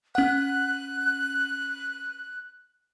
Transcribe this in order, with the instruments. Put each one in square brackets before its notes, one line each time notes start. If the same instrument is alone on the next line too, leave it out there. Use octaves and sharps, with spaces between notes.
[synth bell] C#4 F#5 [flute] F#6